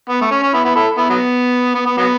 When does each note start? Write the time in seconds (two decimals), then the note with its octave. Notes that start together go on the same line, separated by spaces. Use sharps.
0.09 B3
0.21 A3
0.31 C#4
0.43 C#4
0.53 B3 E4
0.65 B3 E4
0.75 E4 A4
0.97 B3 E4
1.10 F#3 B3
1.75 B3
1.86 B3
1.97 F#3 B3